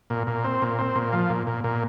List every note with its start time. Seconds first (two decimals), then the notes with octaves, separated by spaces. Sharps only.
0.10 A#2
0.27 A#2
0.44 C4
0.62 A#2
0.79 C4
0.96 A#2
1.13 F3
1.30 A#2
1.47 A#2
1.64 A#2